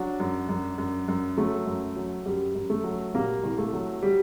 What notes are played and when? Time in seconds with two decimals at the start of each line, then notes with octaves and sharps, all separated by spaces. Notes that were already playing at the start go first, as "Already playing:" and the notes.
Already playing: F#3 D4 F#4
0.20 F#2
0.49 F#2
0.78 F#2
1.08 F#2
1.37 F#3 A3
1.66 F#2
1.96 F#3
2.26 F#2 G3
2.55 F#2
2.70 A3
2.84 F#3
3.14 A#2 G3 A#3
3.43 C2
3.58 A3
3.73 F#3
4.02 G3